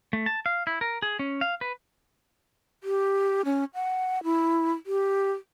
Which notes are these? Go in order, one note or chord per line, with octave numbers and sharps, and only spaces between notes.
A3
A5
F5
E4
A#4
G#4
C#4
F5
B4
G4
C#4
F#5
E4
G4